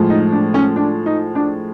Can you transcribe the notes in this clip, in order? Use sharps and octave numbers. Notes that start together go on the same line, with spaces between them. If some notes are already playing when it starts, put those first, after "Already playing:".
Already playing: A2 F3 G#3
D#4
D4
C#4
D4
D#4
D4